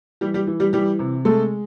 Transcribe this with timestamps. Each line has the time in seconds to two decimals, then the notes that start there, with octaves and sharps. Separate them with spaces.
0.21 E3 G3 G4
0.34 G3 G4
0.47 E3
0.60 G3 G4
0.73 E3 G3 G4
0.99 C3
1.25 G#3 A3 A4